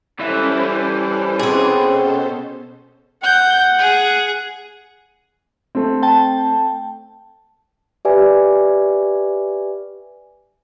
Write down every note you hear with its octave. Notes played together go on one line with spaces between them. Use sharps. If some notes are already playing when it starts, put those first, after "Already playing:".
E3 G3 C#4 A4 C5 E5
B2 C4 G#4
F#5 G6
G#4
A3 C4
G5 A5
G4 B4 D5 E5 G#5